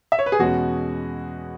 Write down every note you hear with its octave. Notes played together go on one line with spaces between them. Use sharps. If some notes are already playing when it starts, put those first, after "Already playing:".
E5
C#5
B4
G#4
E2 B2 G#3 C#4 F#4